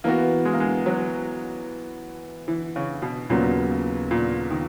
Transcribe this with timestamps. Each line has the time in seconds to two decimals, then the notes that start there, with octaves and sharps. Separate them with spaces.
0.04 E3 A#3 B3 F#4
0.45 G#3
0.53 A#3
0.60 G#3
0.86 F#3
2.48 E3
2.76 C#3
3.02 B2
3.30 D#2 A#2 C#3 F#3 B3 F#4
4.11 A#2
4.51 D#3